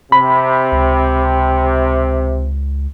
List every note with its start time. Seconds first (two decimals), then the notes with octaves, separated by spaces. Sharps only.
0.12 C3 B5
0.72 C#2